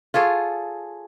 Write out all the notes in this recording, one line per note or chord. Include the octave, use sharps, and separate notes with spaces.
F4 G#4 A4 C#5